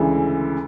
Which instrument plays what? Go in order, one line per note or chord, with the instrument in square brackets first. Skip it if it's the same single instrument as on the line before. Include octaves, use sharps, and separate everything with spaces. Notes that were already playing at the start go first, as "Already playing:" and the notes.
Already playing: [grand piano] D2 C#3 E3 G#3